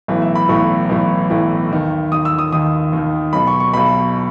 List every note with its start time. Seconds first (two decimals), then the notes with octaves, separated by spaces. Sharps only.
0.08 B1 A2 E3
0.22 E5
0.35 B5
0.49 B1 A2 E3 C#6
0.89 B1 A2 E3
1.30 B1 A2 E3
1.71 D#2 D#3
2.11 D#2 D#3 D#6
2.25 E6
2.38 D#6
2.52 D#2 D#3 D#6
2.93 D#2 D#3
3.33 B1 B2 B5
3.47 C#6
3.60 C#6
3.74 B1 B2 B5